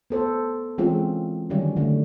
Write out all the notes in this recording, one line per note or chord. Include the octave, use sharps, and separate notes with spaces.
B3 A4 C5
E3 G#3 C4 C#4 F4 G#4
D3 D#3 F#3 G3 C#4
D3 A3